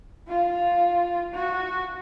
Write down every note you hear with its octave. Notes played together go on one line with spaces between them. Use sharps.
F4
F#4